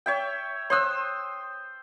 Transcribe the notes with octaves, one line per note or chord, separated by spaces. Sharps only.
C#5 E5 G5
C5 C#5 D#6 E6 F#6